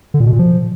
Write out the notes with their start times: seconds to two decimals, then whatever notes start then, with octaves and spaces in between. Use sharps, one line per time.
0.14 D3
0.20 A#2
0.26 B2
0.33 A#2
0.39 F3